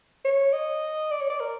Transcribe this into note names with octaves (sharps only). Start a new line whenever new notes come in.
C#5
D#5
D5
C#5
D5
A#4